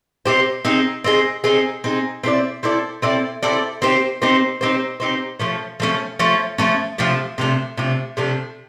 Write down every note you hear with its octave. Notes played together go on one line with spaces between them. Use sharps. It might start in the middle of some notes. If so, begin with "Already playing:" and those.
C4 D#4 G4 C5
C4 D#4 G#4
C4 D#4 G#4
C4 D#4 G#4
C4 D#4 G#4
C4 E4 A4 D5
C4 E4 A4 D5
C4 E4 A4 D5
C4 E4 A4 D5
C4 D#4 G4 C5
C4 D#4 G4 C5
C4 D#4 G4 C5
C4 D#4 G4 C5
F3 A3 C#4
F3 A3 C#4
F3 A3 C#4
F3 A3 C#4
C3 F3 A3 D4
C3 F3 A3 D4
C3 F3 A3 D4
C3 F3 A3 D4